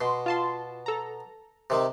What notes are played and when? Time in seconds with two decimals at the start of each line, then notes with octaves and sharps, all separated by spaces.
0.01 B2 C6
0.26 F4 A5 C6
0.86 A4 A#5
1.70 C3 D#3